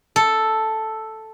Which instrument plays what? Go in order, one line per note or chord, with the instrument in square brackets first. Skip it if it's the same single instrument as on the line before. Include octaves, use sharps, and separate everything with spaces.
[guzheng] A4